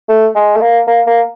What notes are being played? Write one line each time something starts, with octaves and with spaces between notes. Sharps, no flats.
A3
G#3
A3
A#3
A#3
A#3